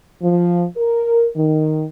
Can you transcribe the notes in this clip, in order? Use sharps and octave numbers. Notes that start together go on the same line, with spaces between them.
F3
A#4
D#3